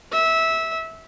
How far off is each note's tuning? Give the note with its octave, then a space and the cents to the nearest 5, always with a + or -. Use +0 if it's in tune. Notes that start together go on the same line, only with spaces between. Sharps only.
E5 -15